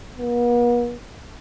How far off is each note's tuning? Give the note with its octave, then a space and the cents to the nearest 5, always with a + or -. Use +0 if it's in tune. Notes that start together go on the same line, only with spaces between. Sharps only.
B3 -45